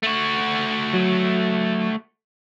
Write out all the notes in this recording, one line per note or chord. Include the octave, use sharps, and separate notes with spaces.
A3 F#4
F#3